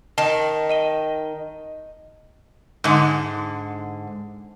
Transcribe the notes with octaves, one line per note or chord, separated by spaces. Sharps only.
D#3 A5
D#5 D#7 G7
G#2 D3